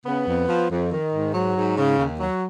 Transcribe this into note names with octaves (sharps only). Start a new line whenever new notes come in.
C#3 B3
F2
F3
F2
D#3
G#2
F#3
G#2
C#3
D#2
F#3